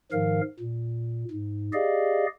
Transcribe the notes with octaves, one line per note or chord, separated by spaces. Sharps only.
G#2 D#3 F3 A#4 F5
A#2
G#2
G4 G#4 D5 D#5 F5